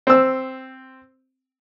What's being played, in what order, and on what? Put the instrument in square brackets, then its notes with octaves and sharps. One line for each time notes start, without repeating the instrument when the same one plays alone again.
[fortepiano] C4 E6